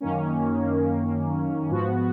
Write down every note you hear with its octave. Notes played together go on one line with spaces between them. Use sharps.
F#2 D#3 A#3 C#4
G#2 F3 B3 F#4